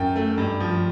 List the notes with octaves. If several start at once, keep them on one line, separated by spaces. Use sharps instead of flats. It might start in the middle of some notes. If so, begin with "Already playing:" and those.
Already playing: F#2 G5
A3
G2
F3